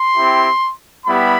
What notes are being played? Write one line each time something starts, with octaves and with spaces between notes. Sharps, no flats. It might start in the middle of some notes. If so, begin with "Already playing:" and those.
Already playing: C6
C4 E4 G4
G3 B3 E4 G4 B5